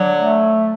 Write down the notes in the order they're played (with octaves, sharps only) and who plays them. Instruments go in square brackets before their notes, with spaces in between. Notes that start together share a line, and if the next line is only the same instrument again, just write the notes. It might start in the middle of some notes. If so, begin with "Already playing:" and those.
Already playing: [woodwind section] D3 F#3
[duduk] A3